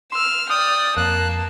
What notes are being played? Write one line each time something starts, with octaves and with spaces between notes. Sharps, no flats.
C6 E6 F6 E7
D5 G5 D#6 F6
F2 A#3 A5 F#6